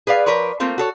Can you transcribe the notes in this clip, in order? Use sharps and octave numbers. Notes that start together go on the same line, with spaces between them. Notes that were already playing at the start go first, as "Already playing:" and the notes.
G#4 B4 D5 F5
F3 A#4 B4 C#5 D5
A3 A#3 C4 F4
F#4 A4 C#5